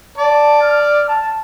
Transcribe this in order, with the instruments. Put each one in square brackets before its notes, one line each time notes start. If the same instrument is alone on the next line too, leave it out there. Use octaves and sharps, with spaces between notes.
[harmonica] D5 [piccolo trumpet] A5
[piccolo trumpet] F6
A5